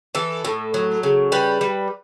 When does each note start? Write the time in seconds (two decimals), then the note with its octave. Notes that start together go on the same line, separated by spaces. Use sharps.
0.15 E3 A4
0.45 A2
0.74 F#3
1.03 C#3
1.32 G3 B4
1.61 G3